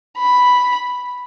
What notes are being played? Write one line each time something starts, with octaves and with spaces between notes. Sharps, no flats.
B5